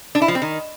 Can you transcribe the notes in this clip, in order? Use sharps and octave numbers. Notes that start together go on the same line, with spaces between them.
D4
E4
F3
C4
D#3